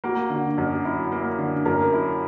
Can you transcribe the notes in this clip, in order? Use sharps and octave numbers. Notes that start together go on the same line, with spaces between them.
A#3 F#4
D3
F#2
E4
A#3
D3
F#2 A#4
E4